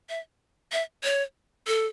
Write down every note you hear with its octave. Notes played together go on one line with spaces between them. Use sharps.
E5
E5
C#5
A4